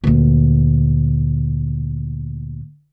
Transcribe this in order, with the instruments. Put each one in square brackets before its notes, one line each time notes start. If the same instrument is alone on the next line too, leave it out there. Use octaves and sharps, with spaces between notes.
[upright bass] D2 A#2